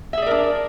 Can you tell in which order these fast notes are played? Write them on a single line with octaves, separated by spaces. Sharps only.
E5 G#4 D5 A#4 D4